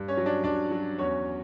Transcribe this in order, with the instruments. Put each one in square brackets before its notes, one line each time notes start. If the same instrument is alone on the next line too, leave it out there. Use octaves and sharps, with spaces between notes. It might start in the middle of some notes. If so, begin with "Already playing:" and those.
Already playing: [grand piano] G2
C#4 C#5
F#3
D4 D5
G2 D4 D5
F#3
E2 C#4 C#5